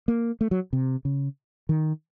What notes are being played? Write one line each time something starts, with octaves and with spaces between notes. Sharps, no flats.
A#3
A3
F#3
C3
C#3
D#3